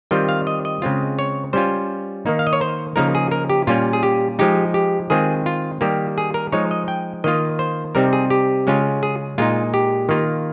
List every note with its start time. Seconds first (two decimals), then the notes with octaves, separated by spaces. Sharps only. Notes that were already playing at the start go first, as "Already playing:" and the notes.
0.11 D#3 G3 C4 F4 G5
0.29 F5
0.47 D#5
0.65 D#5
0.82 C#3 G#3 C4 F4
1.19 C#5
1.53 G3 C#4 F4 C5
2.26 D#3 A#3 D#4
2.39 F5
2.47 D#5
2.53 C#5
2.61 C5
2.96 C#3 F3 A#3 D#4 A#4
3.15 G#4
3.31 A#4
3.50 G4
3.67 A#2 G3 A#3 C#4 F4
3.93 G#4
4.03 G4
4.39 F3 G#3 D#4 G4
4.74 G4
5.10 D#3 G#3 C4 F4 G#4
5.46 F4
5.81 D#3 G3 A#3 G4
6.18 G#4
6.34 A#4
6.52 F3 G#3 D#4 C#5
6.71 D#5
6.88 G5
7.24 D#3 A#3 F4 D#5
7.59 C5
7.95 C3 G3 C4 D#4 A#4
8.13 G#4
8.30 G4
8.67 C#3 G#3 C#4 F4
9.03 G#4
9.38 A#2 G#3 D#4 F4
9.74 G4
10.09 D#3 A#3 F4